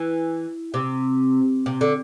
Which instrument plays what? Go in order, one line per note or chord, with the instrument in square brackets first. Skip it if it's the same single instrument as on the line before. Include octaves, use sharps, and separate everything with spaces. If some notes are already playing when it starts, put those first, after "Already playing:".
Already playing: [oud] E3
C3
C3
D3